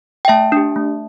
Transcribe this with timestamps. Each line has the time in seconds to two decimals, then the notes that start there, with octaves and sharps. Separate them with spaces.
0.25 G5
0.28 A3 E5 A5
0.52 D4 G4
0.76 A3